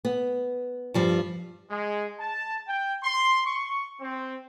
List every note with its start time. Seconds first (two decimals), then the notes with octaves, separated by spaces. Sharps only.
0.05 B3
0.94 G2 F3 G3
1.70 G#3
2.20 A5
2.68 G5
3.03 C6
3.46 C#6
4.01 C4